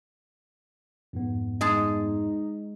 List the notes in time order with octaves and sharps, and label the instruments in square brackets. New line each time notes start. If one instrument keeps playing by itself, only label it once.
[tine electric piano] F2 G#2 B3
[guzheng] G#3 G#4 A5 [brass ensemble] D#4